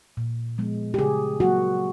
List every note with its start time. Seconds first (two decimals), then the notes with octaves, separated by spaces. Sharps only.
0.17 A#2
0.58 F3 G#3 B3
0.94 G4
0.99 C#3 G#4
1.40 F#3 A#3 F#4